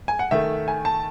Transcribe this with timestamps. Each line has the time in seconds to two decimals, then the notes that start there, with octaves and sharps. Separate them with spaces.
0.08 G#5
0.19 F#5
0.31 D#3 A3 E5
0.68 G#5
0.85 A5